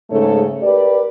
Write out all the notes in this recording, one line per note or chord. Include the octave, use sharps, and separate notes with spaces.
G#2 C#3 A3 A4 C#5
G4 A#4 B4 D5